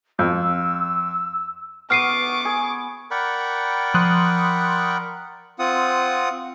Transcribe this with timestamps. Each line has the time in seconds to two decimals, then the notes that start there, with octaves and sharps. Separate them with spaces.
0.19 F2 E6
1.90 B3 C#6 D6 F6 C7 D#7
2.45 G#4
3.11 A#4 D5 F#5 G5 B5 C#6
3.94 F3 C6 D#6 F#6
5.59 C4 F4 F#5 D#6